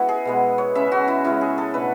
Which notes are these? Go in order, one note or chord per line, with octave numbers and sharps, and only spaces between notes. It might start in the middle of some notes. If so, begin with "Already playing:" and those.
Already playing: G#3 B3 E4 F#4
G#4
B2 G#3 B3
C#5
C#3 G#3 C#4 E5
F#4
E4
C#3 G#3 C#4 E4
G#4
A4
B2 A3 D4 B4